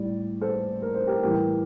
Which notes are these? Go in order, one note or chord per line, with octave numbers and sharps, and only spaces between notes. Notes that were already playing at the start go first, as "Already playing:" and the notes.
Already playing: A2 G3 D5
A4 C5
A#4
C5
G4 A#4
A2 E3 G3 G4 A#4